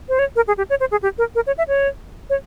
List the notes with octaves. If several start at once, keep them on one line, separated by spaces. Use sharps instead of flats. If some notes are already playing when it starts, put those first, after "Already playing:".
C5
C#5
A#4
G#4
G4
C#5
C5
G#4
G4
A#4
A#4
C#5
E5
C#5
C#5